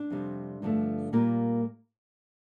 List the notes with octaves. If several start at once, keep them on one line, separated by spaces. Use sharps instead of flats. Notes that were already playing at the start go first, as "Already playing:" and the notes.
Already playing: D4
F2 C3 G3
G2 D3 F3 A3
A#2 G3 A#3 F4